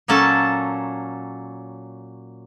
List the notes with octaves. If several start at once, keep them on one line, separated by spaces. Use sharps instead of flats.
A#2 F#3 A#3 C#4 A4 A5